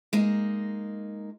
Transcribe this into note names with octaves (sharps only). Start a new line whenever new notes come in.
G#3 A#3 D#4